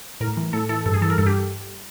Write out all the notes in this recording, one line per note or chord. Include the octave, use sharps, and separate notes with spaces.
A2 A#4
E3
A2 A4
E3 A4
G2 A4
G#4
E3 A4
A#4
G2 A4
G4